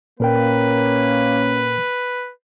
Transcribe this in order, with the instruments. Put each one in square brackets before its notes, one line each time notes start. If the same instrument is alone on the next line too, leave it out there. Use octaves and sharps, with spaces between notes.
[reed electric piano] A#2 A#4 G5 [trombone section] A#3 [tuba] C#4 [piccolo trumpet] B4